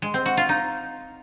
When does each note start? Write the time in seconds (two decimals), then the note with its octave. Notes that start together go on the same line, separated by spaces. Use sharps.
0.02 G#3
0.14 C4
0.26 F#4
0.37 F4
0.49 D#4